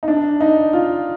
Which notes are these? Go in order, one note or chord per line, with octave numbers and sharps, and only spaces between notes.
D#4
D4
D#4
F4